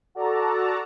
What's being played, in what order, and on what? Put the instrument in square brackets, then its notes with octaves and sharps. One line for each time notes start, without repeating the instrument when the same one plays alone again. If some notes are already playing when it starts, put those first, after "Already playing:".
[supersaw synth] F#4 A4 D5 A5 A#5